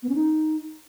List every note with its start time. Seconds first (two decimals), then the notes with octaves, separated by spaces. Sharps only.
0.03 B3
0.09 C#4
0.15 D#4